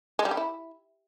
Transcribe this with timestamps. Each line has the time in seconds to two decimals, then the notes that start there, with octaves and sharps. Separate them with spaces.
0.19 G#3
0.25 G3
0.31 G4
0.37 E4